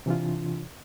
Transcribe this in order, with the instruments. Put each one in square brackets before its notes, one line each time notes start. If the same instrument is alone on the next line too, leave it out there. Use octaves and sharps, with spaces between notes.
[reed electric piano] C3 E3 D4 F4